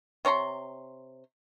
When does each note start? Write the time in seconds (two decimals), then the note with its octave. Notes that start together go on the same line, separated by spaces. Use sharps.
0.25 C3 C#5 A#5 C6